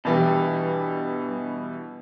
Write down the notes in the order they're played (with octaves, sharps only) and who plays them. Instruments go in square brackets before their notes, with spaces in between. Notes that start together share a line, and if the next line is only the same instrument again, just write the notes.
[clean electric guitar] G2 [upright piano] B2 E3 G3